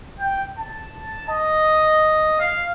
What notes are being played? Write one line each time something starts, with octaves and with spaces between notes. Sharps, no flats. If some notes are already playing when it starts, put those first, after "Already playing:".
G5
A5
D#5
F5